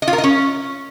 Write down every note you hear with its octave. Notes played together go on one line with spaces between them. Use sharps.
D#5
F4
A#4
D#5
C#4